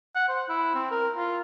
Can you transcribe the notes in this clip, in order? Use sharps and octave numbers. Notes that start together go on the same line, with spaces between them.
F#5
C5
E4
C4
A#4
F4